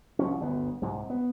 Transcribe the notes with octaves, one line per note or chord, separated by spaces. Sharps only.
C2 F3 C#4
G1 D2 B3
C2 G#2 C3
B3